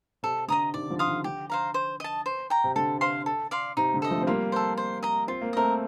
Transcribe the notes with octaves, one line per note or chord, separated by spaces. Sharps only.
C3 A4
D3 D#5 A#5 D#6
C3 D#3 D5
D3 F3
F5 C6 D#6
C3 D#3
D3 G4
C5 F5 A#5
C5
D#5 A5
C5
G5 A#5
C3
D3 A4
C5 F5 C6
A4
D5 F5 C6
C3 D#4
D3
A4 D#5
F3 A3
C4
G3 A#3 F4
A4 C5
C5
D#5 A#5
C4 F4
A#3
A3 C4 A#4 D#5